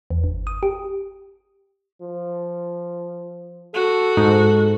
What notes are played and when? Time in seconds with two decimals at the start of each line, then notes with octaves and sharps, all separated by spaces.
0.10 E2
0.24 G1
0.47 D#6
0.63 G4
2.01 F3
3.74 F#4 A4
4.17 G#2